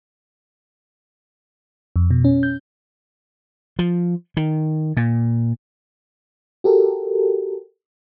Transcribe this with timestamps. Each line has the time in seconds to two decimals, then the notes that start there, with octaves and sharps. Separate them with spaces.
1.96 F2
2.11 B2
2.25 C#4
2.43 G6
3.79 F3
4.37 D#3
4.97 A#2
6.64 F#4 G4 A4 A#4